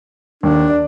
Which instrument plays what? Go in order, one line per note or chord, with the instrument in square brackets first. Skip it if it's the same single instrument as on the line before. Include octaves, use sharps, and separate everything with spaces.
[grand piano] D#2 [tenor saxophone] D4
[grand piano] D5